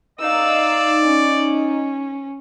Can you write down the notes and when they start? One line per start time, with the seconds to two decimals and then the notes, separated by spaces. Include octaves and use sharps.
0.20 D#4 D5 F5 E6
1.04 C#4